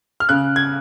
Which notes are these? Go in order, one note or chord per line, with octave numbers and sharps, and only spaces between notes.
F6
C#3 F#6
G#6